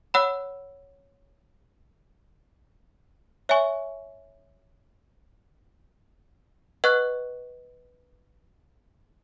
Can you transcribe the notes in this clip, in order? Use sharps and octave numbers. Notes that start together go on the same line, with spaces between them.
C#5 F#5 B5 E6
C#5 E5 G#5 C#6
B4 D#5 F#5 C#6 F#6